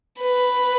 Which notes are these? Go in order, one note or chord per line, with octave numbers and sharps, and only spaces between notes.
B4